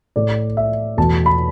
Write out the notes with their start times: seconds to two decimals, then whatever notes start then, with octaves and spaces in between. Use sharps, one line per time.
0.16 A2 A3 D5
0.57 E5
0.97 E2 B2 A3 A5
1.26 B5